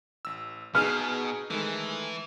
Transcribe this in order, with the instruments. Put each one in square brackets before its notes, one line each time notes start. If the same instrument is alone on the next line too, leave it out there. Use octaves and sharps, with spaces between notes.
[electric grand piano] A1 E6
[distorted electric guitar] B2 [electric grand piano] D#4 G#4 B4 [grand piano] F6
[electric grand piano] D#3 G#3 A3 [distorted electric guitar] E3